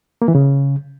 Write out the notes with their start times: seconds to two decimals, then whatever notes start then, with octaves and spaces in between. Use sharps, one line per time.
0.22 A#3
0.28 E3
0.35 C#3